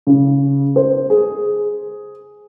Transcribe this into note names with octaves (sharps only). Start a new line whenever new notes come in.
C#3
C5
G#4